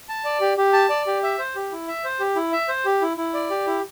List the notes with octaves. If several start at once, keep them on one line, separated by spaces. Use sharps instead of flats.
A5
D5
G4
G4
A5
D5
G4
E5
C5
G4
E4
E5
C5
G4
E4
E5
C5
G4
E4
E4
D5
G4
E4